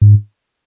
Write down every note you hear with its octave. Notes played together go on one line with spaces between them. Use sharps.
G#2